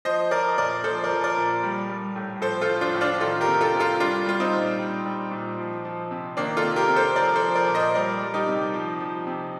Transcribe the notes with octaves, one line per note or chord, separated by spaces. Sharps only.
F3 C5 D#5
F3 A#4 D5
A#2 A#4 D5
F3 A4 C5
A#4 D5
F3
A#4 D5
A#2
G3
G3
A2
F3 A4 C5
F4 A4
F3
D4 F4
A2
D4 F4
D#3 F4 A4
G4 A#4
C3
F4 A4
C3
F4 A4
G3 D4 F4
G3 F4
C4 D#4
A#2
G3
G3
A#2
F3
F3
C3
D#3 A#3 D4
F4 A4
C3
G4 A#4
C3
A4 C5
F3 A#4 D5
A4 C5
F3
A#4 D5
A#2
C5 D#5
G3 A#4 D5
G3
D#4 G4
C3
F3
F3
C3